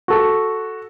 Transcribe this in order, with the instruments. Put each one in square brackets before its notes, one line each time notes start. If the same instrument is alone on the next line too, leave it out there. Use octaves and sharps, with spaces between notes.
[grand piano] F#4 A4